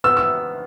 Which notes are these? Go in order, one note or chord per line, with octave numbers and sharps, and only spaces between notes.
B3 E6
E6